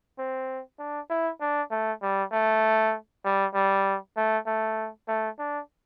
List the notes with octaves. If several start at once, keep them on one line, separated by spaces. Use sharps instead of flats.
C4
D4
E4
D4
A3
G3
A3
G3
G3
A3
A3
A3
D4